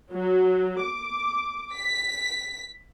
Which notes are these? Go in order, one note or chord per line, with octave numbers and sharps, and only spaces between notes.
F#3
D6
B6